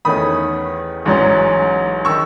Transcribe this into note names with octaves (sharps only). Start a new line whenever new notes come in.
E2 D#3 A3 C#4 B5 D#6
A1 G#2 F#3 C#4
D#3 C#6 E6